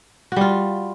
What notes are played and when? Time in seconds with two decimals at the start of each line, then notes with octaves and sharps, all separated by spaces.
0.32 F#4
0.36 G3
0.41 F4